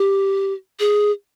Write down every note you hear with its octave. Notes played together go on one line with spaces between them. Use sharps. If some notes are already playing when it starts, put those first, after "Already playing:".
Already playing: G4
G#4